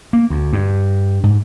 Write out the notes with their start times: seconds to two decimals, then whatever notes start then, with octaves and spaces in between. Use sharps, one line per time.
0.13 A#3
0.30 D2
0.53 G2
1.24 G#2